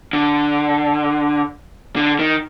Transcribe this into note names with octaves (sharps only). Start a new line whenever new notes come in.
D3
D3
D#3